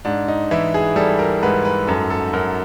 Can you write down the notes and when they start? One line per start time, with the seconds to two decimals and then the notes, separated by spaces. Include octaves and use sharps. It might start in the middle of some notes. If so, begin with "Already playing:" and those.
0.05 G#2 D4
0.28 D#4
0.51 E3 E4
0.74 G#4
0.96 G3 A4
1.19 A#4
1.43 G#2 B4
1.65 B4
1.87 F#2 A4
2.10 A4
2.33 F#2 A#4